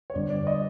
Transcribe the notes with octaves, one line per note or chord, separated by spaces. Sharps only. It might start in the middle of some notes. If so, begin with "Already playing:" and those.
C#5
G1 G2 D3 G3 D5
D5
D#5